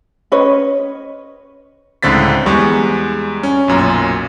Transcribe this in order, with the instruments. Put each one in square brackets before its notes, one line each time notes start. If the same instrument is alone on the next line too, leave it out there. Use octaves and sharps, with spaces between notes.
[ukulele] C#4 B4 C#5 D#5
[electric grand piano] C#2 A2 D3 C4 A6 B6
E2 G3 G#3 C#6
C#4
B1 F#2 A#2